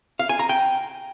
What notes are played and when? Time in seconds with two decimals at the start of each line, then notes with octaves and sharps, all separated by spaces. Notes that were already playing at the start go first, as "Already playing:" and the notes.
0.19 F5
0.29 G#5
0.39 A#5
0.49 G5